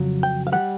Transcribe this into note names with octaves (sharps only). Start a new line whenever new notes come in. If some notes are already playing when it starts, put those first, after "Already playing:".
Already playing: F2 C#3 F#3
G5
F5
E3 G3 F#5